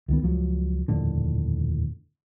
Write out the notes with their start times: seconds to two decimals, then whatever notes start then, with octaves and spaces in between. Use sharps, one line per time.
0.08 C#2 D#3 B3
0.23 C#2 F3 F#3
0.88 D#1 F2 A2 D3